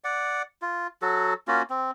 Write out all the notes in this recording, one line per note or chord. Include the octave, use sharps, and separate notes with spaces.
D5 F#5
F4
F#3 F#4 A4
A#3 C#4 F4 F#4
C4